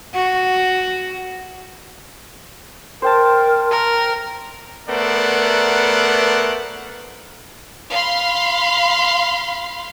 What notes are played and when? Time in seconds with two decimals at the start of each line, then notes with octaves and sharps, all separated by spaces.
0.14 F#4
3.02 A#4 C5 G5 A5
3.71 A#4
4.89 A3 B3 A#4 C5 D5 F#5
7.91 F5 B5 C6